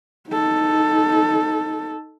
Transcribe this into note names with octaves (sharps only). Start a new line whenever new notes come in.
D#4 A4